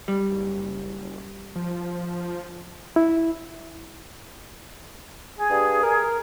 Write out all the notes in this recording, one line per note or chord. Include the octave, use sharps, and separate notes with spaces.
G3
F#1
F3
E4
G#4
G2
A#4